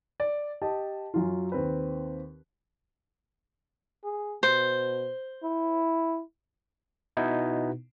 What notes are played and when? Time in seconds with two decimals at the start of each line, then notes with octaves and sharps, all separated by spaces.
0.20 D5
0.62 G4 D#5 A5
1.14 F#2 F#3 F4
1.52 D#2 C4 B4
4.04 G#4
4.43 B2 C5
5.43 E4
7.17 B2 B3 D#4 E4